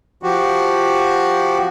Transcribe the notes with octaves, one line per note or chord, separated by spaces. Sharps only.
F3 F#4 G4